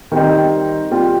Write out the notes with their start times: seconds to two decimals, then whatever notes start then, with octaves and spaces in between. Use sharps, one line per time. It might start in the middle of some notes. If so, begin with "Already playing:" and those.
0.12 D#3 G3 C4 D#4
0.91 G3 C4 F4